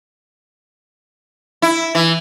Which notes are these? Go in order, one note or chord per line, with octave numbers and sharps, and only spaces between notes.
E4
E3